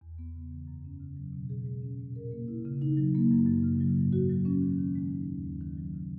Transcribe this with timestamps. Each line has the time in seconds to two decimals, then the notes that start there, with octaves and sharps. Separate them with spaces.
0.01 E2
0.18 B3
0.34 C#3
0.52 E3
0.68 F#2
0.85 C#4
1.00 C#3
1.17 F#3
1.33 B2
1.49 G#4
1.66 G#3
1.82 C#4
2.00 A#2
2.16 A#4
2.32 A#3
2.48 E4
2.65 C#3
2.82 D#4
2.97 F#3
3.15 A#3
3.31 F#2
3.47 F#2
3.63 C#3
3.80 F#3
3.96 G#2
4.13 F#4
4.29 F#3
4.45 C#4
4.62 D#3
4.79 D#3
4.95 G#3
5.12 D#4
5.28 D#2
5.45 D#2
5.61 D#3
5.78 F#3
5.94 C#3